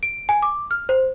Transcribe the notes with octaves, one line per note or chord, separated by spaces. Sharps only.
D7
G#5
D6
F6
C5